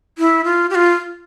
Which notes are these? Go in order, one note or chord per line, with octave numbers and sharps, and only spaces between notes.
E4
F4
G4
F4